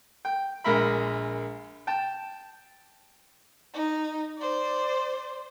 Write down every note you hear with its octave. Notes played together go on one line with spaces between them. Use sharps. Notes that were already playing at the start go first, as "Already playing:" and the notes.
G5
A#1 G#3 A#4 E5 B5
G5 A5
D#4
C5 D5